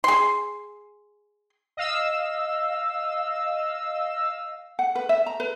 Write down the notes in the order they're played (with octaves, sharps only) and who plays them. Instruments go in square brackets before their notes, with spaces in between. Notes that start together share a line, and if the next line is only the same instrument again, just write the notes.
[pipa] G#4 C6
[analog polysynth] D#5 F5 E6
[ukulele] F#5
B4
E5
A#5
B4